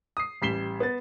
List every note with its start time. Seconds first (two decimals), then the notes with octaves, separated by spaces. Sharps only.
0.17 D#6 C7
0.42 A1 G3 B6 C7 E7 G7
0.80 B3 A6